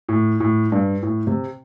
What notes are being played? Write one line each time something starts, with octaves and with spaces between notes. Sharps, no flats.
A2
A2
G2
A2
C3